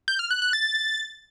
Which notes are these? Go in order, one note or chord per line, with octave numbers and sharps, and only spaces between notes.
G6
F6
F#6
F#6
A6